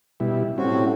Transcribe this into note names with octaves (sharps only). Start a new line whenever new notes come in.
B2 G3 E4
A2 G3 C4 C#4 F#4